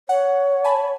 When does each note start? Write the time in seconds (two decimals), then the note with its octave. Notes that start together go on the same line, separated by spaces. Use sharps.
0.09 C#5 F#5
0.64 G#5 A5 B5